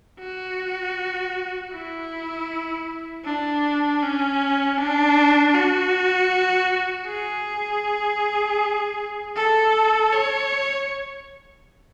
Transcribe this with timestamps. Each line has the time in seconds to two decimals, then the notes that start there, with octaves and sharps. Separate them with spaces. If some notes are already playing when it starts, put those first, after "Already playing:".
0.20 F#4
1.72 E4
3.24 D4
4.02 C#4
4.78 D4
5.54 F#4
7.07 G#4
9.36 A4
10.13 C#5